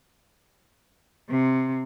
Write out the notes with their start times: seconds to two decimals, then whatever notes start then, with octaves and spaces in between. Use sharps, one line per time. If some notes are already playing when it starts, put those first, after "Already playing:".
1.30 C3